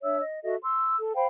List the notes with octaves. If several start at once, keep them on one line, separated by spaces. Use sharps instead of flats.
D4 C#5 E5 E6
D#5
F#4 A4 D#5 E5
C6 E6
A4
C5 F5 G5 B5